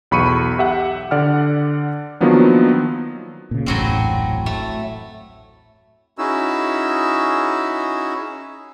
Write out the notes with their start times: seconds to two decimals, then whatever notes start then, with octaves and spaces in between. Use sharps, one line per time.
0.11 B1 E2 B5 C#6 C#7 D#7
0.58 G4 E5 F#5
1.11 D3 D5 F#5 F6
2.20 D#3 F3 F#3 A#3 B3 D4
3.51 A#2 C#3
3.66 D#1 A1 F#2 A2 F#3 C4
4.46 A3
6.18 C#4 D#4 E4 F#4 G#4 E6